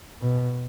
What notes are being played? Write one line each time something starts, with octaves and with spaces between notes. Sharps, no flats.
B2